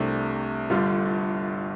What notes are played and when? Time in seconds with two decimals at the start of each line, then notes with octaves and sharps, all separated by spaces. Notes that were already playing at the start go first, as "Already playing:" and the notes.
Already playing: C2 C3 A3 D4
0.70 G1 G2 D3 G3 F4